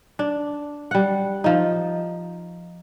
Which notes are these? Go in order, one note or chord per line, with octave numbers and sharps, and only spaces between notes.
D4
G3 F#5
F3 D#4